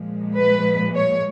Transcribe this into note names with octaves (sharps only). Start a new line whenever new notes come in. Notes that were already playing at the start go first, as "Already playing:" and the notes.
Already playing: A#2 F3 G#3
B4
C#5